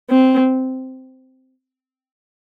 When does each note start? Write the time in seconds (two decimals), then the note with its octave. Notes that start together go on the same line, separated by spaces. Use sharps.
0.10 C4